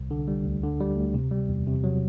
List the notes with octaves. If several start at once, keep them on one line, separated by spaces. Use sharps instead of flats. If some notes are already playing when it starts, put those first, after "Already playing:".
Already playing: C2
D3
G3
D2
D3
G3
D2
C3
G3
E2
C3
F#3